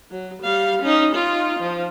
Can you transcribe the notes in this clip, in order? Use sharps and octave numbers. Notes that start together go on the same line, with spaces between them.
F#3
G3 F5
C#4 D#4
D#4 F4
F3